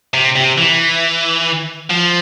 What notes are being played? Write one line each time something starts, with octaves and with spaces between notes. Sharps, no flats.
C3
C3
E3
F3